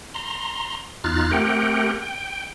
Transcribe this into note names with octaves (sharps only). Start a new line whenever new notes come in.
A#5 C6
E2 D#4 F4 F6 F#6 A6
A3 C4 G4 A#4 F#5 G5
G5